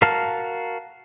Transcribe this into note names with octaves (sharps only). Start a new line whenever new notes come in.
F#4 A#4 F5 A5 F6